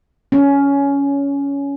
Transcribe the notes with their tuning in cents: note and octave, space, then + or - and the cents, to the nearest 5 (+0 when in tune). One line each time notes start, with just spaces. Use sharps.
C#4 +15